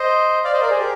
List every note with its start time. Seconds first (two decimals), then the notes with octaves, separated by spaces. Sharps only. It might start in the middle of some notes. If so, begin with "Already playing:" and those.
Already playing: C5 D#5
0.44 D5 F5
0.53 C5 D#5
0.61 A#4 D5
0.70 G#4 C5
0.79 G4 A#4